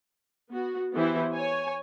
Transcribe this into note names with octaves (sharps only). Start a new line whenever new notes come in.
B3 F#4
E3 B3 E4 G4 C5
C#5 G#5